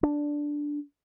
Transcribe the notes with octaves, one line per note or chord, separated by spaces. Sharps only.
D4